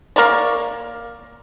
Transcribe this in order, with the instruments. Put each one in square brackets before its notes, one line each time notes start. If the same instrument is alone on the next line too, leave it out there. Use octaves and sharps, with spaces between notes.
[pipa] A#3 A#4 C#5 D5